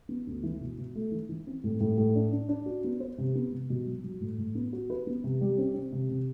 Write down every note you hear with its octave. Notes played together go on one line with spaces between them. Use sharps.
B3
D2
E3
B2
B2
A3
E3
E3
C4
A2
A2
A2
D4
D4
D4
F#4
B3
C5
C3
B3
C3
B2
F#3
F#3
A2
A2
B3
F#4
B4
B3
C3
G3
C4
C4
C3
C3